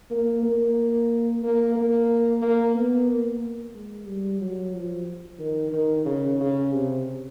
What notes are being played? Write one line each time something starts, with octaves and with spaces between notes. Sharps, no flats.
A#3
A#3
A#3
A#3
A#3
B3
A#3
G#3
G3
F#3
F3
D#3
D#3
C#3
C#3
C3